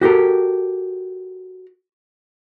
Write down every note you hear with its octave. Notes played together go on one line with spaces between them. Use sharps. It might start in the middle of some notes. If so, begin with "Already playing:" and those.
F#4 G4 A4 A#4